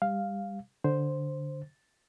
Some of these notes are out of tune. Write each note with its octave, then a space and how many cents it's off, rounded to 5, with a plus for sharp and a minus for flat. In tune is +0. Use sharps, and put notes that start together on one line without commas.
G3 +30 F5 +0
D3 +0 C5 +0